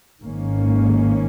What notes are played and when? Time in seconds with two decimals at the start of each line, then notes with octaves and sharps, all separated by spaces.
0.23 G#1 G#2 D#3 A#3 C#4